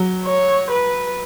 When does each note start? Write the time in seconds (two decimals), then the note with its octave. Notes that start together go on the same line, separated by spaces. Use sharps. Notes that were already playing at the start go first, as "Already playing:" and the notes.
Already playing: F#3
0.26 C#5
0.71 B4